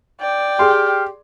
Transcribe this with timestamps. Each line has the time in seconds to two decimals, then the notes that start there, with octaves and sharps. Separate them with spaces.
0.21 D5 G5
0.59 G4 G#4 C6 F6